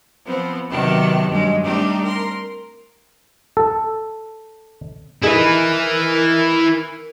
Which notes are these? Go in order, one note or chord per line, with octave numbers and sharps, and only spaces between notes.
F3 B3 C4
C3 D#3 F#3 B3 G4 A5
G2 F#3 G#3
G3 A3 C4 D4 D#4 G4
A#4 C6
A4
D#4 E4 G#4 A#4 B4